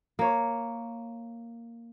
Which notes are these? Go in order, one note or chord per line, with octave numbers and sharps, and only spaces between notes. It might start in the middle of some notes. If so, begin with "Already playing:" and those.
A#3 C#5